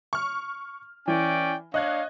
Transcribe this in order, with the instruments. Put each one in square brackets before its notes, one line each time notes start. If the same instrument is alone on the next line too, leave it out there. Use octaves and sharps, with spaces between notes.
[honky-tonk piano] C#6 F6
[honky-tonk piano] E3 [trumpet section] C#4 D5 G5
[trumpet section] D4 C#5 F5 [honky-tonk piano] D#5 F#6 G#6